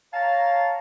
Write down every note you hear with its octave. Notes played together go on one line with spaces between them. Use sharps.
C#5 F5 A5 A#5